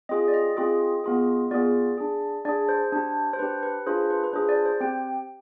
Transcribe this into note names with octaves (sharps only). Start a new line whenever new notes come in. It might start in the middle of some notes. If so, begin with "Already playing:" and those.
C4 F4 G#4 D#5
D5
D#5
C4 F4 G#4
B3 F4 G#4
B3 F4 G#4 D5
D4 G#4
D4 G#4 D5
C5
D4 G4
C5
D4 G4 B4
B4
D4 F4 G#4 C5
B4
B4
D4 F4 G#4 C5
D5
C5
C4 G4 G5